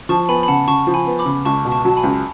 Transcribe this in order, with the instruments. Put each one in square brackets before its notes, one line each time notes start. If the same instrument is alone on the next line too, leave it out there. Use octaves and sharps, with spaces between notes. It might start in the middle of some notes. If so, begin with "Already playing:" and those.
[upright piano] F3 [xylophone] A5 C#6
[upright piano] B3 [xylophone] G#5 B5
[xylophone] B5
[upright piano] C#3 [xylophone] F#5 A5
[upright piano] C#3 [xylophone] A5 C#6
[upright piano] F3
[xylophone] G#5 B5
[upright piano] B3
[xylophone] B5 D6
[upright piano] C#3
[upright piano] C#2 [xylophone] A5 C#6
[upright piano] B2
[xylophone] A5 C#6
[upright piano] F#3 [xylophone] A5
[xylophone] G#5 B5
[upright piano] C#2